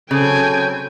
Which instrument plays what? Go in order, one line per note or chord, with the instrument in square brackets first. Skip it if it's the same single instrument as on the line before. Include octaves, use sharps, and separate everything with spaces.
[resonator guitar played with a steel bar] C#3 [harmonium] F#3 C4 A4 [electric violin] G5 G#5